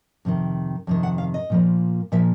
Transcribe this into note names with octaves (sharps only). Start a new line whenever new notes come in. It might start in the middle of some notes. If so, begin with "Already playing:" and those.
F2 C3 D#3
F2 C3 D#3
F#5
F5
D#5
A#2 F3 A#3
A#2 F3 A#3 E5